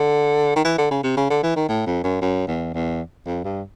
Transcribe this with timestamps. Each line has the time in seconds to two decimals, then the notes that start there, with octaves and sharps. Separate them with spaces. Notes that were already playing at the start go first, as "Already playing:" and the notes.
Already playing: D3
0.56 D#3
0.65 E3
0.78 D3
0.91 C#3
1.03 C3
1.17 C#3
1.30 D3
1.43 E3
1.56 D#3
1.69 A2
1.87 F2
2.04 F#2
2.22 F#2
2.47 E2
2.74 E2
3.26 F2
3.44 G2